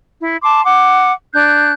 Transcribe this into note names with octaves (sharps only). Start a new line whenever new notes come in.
E4
A5 C6 D6
F#5 D6
D4 F#6 G6